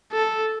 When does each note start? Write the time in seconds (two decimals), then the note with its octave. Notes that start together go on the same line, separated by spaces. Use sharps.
0.13 A4